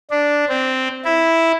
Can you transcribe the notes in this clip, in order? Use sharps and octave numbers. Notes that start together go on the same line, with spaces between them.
D4
C4
E4